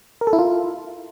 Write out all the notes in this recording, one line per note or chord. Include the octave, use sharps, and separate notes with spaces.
A#4
A4
E4
F4